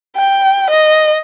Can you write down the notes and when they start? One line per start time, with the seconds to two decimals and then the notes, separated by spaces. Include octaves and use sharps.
0.17 G5
0.70 D#5